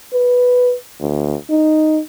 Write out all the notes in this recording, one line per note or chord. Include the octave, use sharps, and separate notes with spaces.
B4
D2
D#4